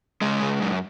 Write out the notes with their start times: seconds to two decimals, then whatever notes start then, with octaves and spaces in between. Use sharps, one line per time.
0.21 C#3 G#3
0.42 C#3
0.62 F#2